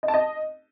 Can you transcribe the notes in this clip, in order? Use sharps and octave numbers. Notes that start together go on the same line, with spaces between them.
D#5
A5
D#5